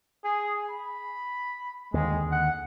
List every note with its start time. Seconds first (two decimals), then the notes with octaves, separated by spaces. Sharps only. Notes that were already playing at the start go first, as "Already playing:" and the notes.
0.24 G#4
0.70 B5
1.94 D#2 D3 G#3
2.31 F#5